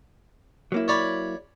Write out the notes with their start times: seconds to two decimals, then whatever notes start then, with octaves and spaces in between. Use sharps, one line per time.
0.72 F#3 A#3 E4
0.88 C#5 D5 B5